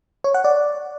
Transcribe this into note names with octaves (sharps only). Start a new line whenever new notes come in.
C#5
F#5
D5